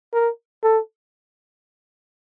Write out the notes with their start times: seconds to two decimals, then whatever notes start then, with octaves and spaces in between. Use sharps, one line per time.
0.14 A#4
0.64 A4